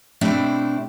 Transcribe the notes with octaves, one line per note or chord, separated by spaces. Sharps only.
B2 A3 C4 D4 E4 G4